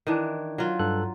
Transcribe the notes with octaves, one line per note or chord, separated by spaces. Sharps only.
D#3 E3 D4
F#3 F4
G2 A4 F#6